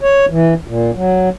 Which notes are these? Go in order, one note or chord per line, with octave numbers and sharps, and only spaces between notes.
C#5
E3
A#2
F#3